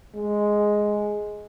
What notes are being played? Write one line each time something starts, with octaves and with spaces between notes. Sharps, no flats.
G#3